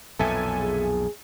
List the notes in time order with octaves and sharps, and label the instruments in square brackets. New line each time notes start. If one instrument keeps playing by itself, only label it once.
[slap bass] B1 F2 A#2 [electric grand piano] A4 E5 G#5
[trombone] G#4